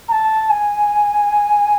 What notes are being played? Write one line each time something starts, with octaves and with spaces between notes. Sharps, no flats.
A#5
A5
G#5